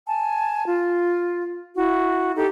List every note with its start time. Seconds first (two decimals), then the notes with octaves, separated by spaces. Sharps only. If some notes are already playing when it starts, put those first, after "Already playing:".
0.07 G#5 A5
0.66 F4
1.77 E4 F#4
2.36 D#4 G4 A4